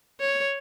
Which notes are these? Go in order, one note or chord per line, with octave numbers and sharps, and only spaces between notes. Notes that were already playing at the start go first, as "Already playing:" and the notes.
C#5